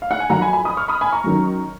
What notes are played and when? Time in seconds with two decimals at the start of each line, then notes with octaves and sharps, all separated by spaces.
0.02 F5
0.11 F#5
0.20 G#5
0.29 F2 D#3 F#3 F#5 A#5
0.41 G#5 B5
0.53 G#5 B5
0.65 B5 D#6
0.77 C#6 F6
0.88 B5 D#6
1.01 G#5 B5
1.12 A#5 C#6
1.24 F#2 D#3 F#3